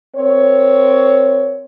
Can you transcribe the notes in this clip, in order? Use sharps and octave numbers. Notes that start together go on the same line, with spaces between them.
C4 A#4 C#5